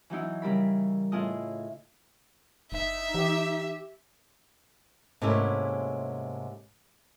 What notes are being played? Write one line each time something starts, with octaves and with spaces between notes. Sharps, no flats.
E3 F#3 D#4 E4
C#3 G3 A#4 B5
A2 E4 F4 G#4 D#5
F#1 D#4 E5
E3 G4
G#2 C3 A3 A#3 C#4 E4